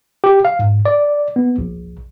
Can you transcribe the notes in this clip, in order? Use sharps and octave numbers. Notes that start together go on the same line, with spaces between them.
G4
F5
G#2
D5
B3
A#1